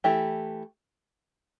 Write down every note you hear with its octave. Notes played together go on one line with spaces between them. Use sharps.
E3 A3 E4 G4